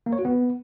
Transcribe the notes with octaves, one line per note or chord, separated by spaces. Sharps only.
A#3
C#5
F#4
B3